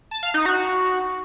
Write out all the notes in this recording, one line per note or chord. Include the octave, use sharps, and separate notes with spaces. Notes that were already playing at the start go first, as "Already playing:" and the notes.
A5
F5
D#4
F#4